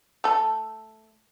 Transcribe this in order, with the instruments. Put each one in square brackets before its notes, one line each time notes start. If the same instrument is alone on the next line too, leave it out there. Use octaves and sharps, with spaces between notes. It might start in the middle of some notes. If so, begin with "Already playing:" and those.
[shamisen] A3 A4